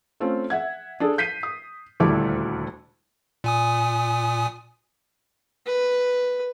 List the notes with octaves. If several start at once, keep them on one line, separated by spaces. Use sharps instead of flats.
A3 C4 C#4 F4
E5 F#5 G#6
D4 G#4 A4
G6 B6 C7 D#7
D#6
D#1 D2 G3 A3 E4 D6
A#2 G#5 D#6
B4